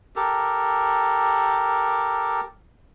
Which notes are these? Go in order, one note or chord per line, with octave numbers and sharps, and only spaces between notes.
G4 A4 A#4